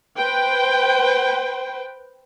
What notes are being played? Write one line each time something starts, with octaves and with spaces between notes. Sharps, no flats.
B4 C5 G5